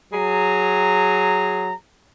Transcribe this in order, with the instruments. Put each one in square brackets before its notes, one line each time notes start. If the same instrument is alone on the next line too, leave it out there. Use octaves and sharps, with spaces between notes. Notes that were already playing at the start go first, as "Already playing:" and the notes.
[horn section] F#3 G#4 A#5